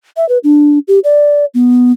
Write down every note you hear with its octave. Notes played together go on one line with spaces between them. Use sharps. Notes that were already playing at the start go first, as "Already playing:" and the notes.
E5
B4
D4
G4
D5
B3